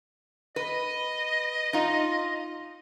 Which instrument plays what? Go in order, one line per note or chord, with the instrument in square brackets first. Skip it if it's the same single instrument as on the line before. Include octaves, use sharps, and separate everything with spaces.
[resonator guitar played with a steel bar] B4 [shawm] D#5
[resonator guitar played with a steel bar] D#4 F4